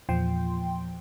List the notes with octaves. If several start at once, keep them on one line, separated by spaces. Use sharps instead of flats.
E2 A#2 F3 G5 C6